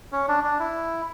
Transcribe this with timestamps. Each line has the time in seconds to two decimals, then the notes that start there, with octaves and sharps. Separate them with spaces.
0.12 C#4
0.28 D4
0.44 D4
0.59 E4